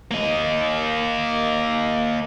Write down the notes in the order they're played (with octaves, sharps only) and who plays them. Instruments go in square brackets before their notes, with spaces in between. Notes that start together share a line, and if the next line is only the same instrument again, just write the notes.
[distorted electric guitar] A#3 D#5